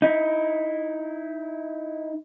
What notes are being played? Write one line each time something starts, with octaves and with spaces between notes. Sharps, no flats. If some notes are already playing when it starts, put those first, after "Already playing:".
D#4 E4